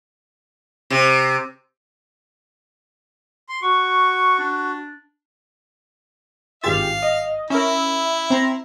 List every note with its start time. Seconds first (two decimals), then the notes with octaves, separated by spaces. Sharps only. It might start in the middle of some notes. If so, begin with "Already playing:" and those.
0.90 C3
3.49 C6
3.63 F#4 C#6
4.39 D4
6.64 G#1 G2 F4 G4 G#4 F5 A6
7.02 D#5
7.50 C#4 E4 A#4 E5
8.30 C4 A#5 C6